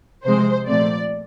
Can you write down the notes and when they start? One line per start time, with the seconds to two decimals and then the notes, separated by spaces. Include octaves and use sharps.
0.25 C3 F3 G#3 C4 C5
0.67 A#2 F3 A3 C4 D5